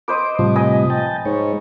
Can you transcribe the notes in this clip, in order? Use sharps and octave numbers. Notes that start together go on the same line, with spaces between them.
B4 C5 D#5 D6
A2 C3 F3 G3
B4 D#5 G#5
G5 A5
G#2 G#3 C#5